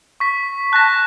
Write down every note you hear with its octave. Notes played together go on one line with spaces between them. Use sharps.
C#6 B6
A5 F#6 A#6